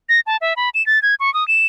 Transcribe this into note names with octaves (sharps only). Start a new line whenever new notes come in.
A#6
A5
E5
B5
E7
A6
G#6
C#6
D#6
E7